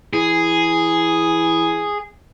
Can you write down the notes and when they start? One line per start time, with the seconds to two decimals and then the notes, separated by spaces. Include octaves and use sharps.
0.13 E3 G#4